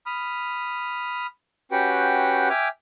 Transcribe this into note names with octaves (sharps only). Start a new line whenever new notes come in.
B5 D#6 F6
C#4 F#4 G4 B4 F#5 G5
E5 G5 G#5 D6 F6